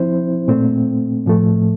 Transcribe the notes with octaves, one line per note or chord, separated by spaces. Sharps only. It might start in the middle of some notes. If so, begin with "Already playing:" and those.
Already playing: F3 C4 E4 C5
A#2 A3 C4
A2 F3 A3